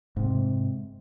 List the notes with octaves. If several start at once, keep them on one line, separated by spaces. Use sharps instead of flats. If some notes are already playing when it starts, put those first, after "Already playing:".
G#2 C3